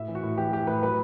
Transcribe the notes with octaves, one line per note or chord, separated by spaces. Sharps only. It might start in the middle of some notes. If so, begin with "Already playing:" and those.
Already playing: A2 E5
E3
F#4
A2
E3 G4
E3 G4
A2 B4
F#3 B4